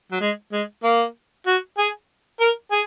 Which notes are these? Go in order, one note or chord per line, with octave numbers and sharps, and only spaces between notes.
F#3
G#3
G#3
A#3
F#4
G#4
A#4
G#4